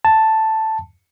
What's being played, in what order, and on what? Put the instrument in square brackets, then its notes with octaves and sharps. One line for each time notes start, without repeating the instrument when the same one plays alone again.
[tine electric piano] A5